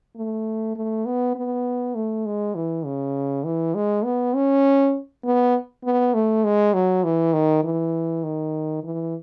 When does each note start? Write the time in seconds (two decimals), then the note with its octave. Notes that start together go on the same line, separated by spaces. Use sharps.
0.16 A3
0.76 A3
1.05 B3
1.35 B3
1.95 A3
2.26 G#3
2.55 E3
2.85 C#3
3.45 E3
3.75 G#3
4.04 B3
4.35 C#4
5.24 B3
5.84 B3
6.14 A3
6.44 G#3
6.74 F#3
7.04 E3
7.33 D#3
7.63 E3
8.23 D#3
8.83 E3